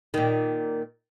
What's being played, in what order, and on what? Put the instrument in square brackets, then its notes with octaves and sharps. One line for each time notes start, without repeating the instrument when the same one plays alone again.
[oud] A#2 D#3